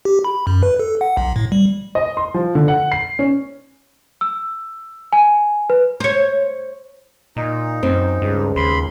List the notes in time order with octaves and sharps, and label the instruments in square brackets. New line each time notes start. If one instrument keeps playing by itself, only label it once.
[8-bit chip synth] G4
B5
F#2
B4
A4
F#5
B1
A2
G3
[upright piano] D#5
C6
F3
D3
F#5
C7
C#4
[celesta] E6
G#5
B4
[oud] C5 C#5
[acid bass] A#2 [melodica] D#4
[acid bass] F#2 [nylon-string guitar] C4
[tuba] C#2 [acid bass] G2
[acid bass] D#2 [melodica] B5 C6